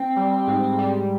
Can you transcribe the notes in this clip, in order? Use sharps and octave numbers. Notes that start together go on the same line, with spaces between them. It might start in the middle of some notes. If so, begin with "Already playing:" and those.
Already playing: C4
G3
G#2
G3